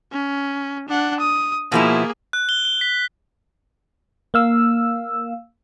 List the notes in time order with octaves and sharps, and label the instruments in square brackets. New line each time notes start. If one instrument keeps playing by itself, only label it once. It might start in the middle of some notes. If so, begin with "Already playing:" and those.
[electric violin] C#4
D4 F#5
D#6
[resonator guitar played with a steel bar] B2 F3 E4 [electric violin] A#3 G#4
[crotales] F#6
G7
G7
B6
[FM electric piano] A#3 F5 E6